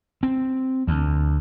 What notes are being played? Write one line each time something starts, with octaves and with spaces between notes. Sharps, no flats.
C4
D2